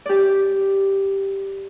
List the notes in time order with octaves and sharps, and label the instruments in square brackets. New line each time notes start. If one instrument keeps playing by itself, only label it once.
[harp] G4 D5